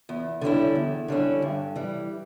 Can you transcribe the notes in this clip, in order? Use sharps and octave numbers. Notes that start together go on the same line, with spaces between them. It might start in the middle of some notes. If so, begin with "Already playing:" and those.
E2
D3 G3 C#4 E4
E2
D3 G3 C#4 E4
G2
E3 G3